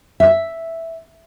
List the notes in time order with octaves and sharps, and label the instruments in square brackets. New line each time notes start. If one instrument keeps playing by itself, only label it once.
[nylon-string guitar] E5